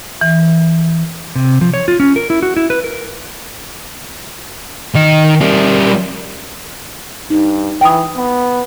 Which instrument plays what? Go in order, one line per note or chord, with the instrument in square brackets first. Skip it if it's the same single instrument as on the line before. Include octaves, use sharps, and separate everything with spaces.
[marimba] E3
[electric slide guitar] C3
F3
C#5
F4
C#4
A#4
E4
F#4
E4
B4
A#4
[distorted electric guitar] D#3 D#5
G3 A#4
[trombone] G2 [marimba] D#4
[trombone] E3 [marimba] G5 D#6
[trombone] B3